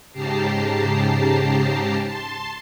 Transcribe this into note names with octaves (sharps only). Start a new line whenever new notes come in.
G#2 C#3 G4 A5 A#5 C7
A5 C6